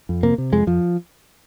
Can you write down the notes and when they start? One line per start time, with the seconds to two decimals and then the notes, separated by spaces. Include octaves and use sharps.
0.09 F2
0.23 C3 A#3
0.38 C3
0.52 F2 G#3
0.67 F2 F3